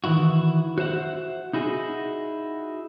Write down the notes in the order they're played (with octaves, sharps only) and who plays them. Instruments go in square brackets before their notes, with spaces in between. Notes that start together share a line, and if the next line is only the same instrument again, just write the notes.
[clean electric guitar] D#3 E3 E4 F#4
F#4 C5 E5 F#5
D#4 E4 F#4 G#4